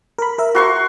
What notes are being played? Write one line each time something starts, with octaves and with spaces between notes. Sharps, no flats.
A#4 B5
A#4 E5
F#4 C6 C#6